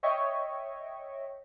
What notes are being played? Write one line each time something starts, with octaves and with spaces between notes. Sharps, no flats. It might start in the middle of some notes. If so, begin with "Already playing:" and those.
C#5 D#5 E5 G5 C#6